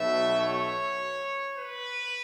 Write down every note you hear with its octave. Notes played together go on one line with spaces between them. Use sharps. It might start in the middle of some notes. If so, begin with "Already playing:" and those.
Already playing: B1 B2 A3 E5
C#5
B4